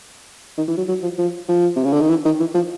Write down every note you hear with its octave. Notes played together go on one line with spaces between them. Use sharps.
D#3
E3
F#3
F#3
F3
F3
F3
C3
C#3
D3
D#3
E3
D#3
E3
F3